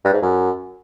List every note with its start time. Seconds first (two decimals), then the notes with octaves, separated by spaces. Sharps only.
0.05 G2
0.13 G#2
0.22 F#2